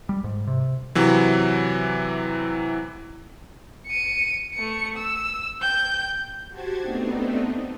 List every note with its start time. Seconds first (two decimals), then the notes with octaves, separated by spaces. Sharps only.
0.09 G3
0.24 G#2
0.47 C3
0.95 C3 E3 F#3
3.87 C#7 D#7
4.54 A3 C#7
4.97 E6
5.62 G5 G6
6.48 F#4 G4 C5 A5 G#6
6.81 A3 B3 C4 D4 D#4